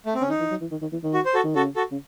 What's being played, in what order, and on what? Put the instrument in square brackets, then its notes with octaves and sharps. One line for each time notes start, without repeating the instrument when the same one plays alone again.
[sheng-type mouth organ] A3
C4
[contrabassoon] C#3 [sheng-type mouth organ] C#4
[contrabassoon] D#3 [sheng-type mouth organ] D#4
[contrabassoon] E3
F#3
E3
D#3
D#3
E3
D#3
[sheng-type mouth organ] F#4
C5
F#4 A4
[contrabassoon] D#3
[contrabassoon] C#3 [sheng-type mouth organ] F#4 A4
[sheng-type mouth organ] F#4 A4
[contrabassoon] C#3